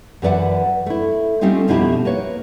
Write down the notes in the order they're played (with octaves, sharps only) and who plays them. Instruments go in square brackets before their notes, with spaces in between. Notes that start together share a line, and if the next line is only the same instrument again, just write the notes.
[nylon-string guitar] F#2 E3 B4 D5 E5 F#5
A3 E4
G3 A3 C4 C#4 D#4 F4
F2 B2 F3 D#4 E4 G4
A#3 B4 C#5